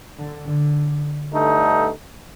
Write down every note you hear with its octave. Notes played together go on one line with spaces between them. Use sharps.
D3
D3
G2 D3 A3 D#4